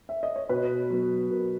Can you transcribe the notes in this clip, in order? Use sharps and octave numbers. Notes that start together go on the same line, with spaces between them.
E5
D#5
C#5
B2 B4
F#3 B3
B2 A#4